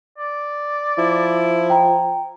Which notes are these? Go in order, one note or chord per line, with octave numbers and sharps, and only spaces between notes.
D5
F3 E4
G5 A#5